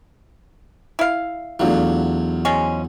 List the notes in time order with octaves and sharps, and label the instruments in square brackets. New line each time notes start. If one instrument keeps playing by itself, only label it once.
[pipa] E4 F5
[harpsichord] E2 F#3 [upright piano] A3 D4 F4
[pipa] F3 G#3 C#4